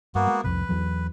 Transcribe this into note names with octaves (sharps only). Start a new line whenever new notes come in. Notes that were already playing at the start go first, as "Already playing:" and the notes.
G2 A#3 B3 F#4
G#3
C2 F2 C3 B4
E2 E3 F#3